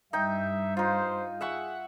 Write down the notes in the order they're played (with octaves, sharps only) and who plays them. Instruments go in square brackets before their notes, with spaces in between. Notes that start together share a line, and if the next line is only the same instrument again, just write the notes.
[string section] G2 [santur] D#4 G5 [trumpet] E5
[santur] D#4 F4 [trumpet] C5
[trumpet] G#4 [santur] E5 F#5 C#6